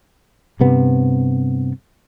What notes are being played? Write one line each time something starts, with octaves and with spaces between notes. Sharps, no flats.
G2 C3 B3